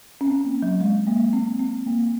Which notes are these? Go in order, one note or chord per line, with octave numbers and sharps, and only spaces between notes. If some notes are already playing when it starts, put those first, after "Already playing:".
C#4
C4
A#3
F#3
G#3
A#3
C4
C4
A#3